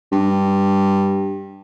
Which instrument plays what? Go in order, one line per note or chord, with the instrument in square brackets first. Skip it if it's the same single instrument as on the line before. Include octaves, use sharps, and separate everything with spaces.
[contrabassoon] G2